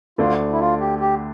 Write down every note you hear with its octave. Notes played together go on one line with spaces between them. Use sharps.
D2 D3 A3 D4 F4
E4
F4
G4
G4